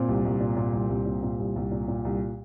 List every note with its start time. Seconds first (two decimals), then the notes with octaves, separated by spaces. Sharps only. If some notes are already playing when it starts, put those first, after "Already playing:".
Already playing: A#2 C4
0.09 C2
0.25 C2
0.40 A#2
0.57 A#2
0.73 C2
0.89 C2
1.06 A#2
1.23 A#2
1.39 C2
1.56 C2
1.71 A#2
1.88 A#2
2.05 C2